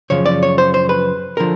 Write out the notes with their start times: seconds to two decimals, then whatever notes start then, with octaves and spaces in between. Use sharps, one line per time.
0.10 F#2 C#3 F3 C#5
0.26 D5
0.43 C#5
0.58 C5
0.74 C5
0.89 B4
1.37 D3 F3 A#4